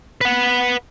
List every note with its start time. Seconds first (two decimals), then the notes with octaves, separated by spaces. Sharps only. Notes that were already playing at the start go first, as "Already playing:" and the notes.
0.21 B4 F#5